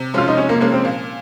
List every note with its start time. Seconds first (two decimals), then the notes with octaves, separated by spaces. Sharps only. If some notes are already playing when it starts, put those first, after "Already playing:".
Already playing: C3
0.14 F3 G#3 C#4 F4
0.28 D#4
0.37 C3 C#4
0.49 A#3
0.61 F3 G#3 A#3 C#4
0.72 C4
0.85 A#2